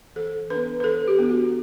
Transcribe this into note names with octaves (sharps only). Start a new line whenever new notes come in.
E3 A4
B3 D4 B4
B4
E3 A4
G4
B3 D4
F#4